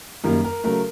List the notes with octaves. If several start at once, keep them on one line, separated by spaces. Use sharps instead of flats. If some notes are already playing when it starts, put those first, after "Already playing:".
F#2 D#3 G3 A#3 A#4
A#4
C#3 F#3 A3 A#4